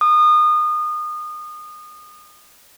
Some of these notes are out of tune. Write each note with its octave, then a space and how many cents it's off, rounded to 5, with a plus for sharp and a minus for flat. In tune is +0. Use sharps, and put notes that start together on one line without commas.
D#6 -30